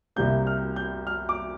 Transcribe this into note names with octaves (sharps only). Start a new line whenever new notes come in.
C2 C3 G3 A#3 G6
F6
G6
F6
D6